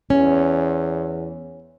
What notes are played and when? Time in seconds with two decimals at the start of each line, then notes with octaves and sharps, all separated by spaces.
0.10 E2 C#4